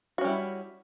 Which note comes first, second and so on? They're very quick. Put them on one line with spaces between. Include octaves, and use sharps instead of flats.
F#4 C#4 G3 E4